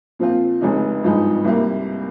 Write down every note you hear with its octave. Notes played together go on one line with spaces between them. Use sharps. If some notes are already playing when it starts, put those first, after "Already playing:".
A#2 F3 C4 F4
F1 F2 C#3 G#3 D#4
G#1 G2 F3 G#3 D#4
C2 C3 G3 A#3